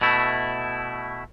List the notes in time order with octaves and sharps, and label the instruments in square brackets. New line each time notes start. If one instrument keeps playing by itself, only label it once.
[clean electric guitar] B2 A3 E4